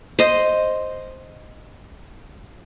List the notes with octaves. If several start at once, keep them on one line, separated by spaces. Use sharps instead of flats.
C5 D#5